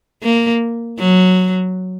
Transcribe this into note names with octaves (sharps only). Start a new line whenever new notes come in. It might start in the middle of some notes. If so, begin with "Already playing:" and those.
A#3
F#3